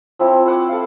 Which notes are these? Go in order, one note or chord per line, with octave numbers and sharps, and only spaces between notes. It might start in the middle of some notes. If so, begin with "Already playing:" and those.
F3 C4 E4 C#5
C5 F#5 D6
A4 F5